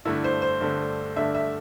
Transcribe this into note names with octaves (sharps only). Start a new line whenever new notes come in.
G2 D3 A3 D4 E4
C5
C5
G2 D3 A3 D4
G2 D3 A3 D4 E5
E5